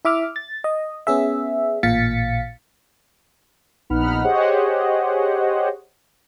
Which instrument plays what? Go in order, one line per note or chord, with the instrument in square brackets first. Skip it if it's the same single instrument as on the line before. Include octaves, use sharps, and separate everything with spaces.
[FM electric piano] E4 E5 D6 F6
A6
D#5
B3 C#4 G#4 E5
A1 A#2 F5 A6 B6 C#7
[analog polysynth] A#1 B3 D#4 F#5 B5 F6
G4 G#4 C5 C#5 D#5 F#5